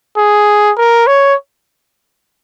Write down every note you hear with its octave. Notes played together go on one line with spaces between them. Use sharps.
G#4
A#4
C#5